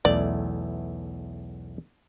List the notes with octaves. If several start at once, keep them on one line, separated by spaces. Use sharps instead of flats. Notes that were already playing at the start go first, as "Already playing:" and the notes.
B1 E2 A3 D5